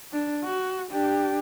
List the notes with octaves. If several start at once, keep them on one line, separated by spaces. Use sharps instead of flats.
D4
F#4
D4 G4